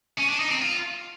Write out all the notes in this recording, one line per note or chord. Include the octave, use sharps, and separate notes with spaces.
C#4
D4
D#4
C4
F4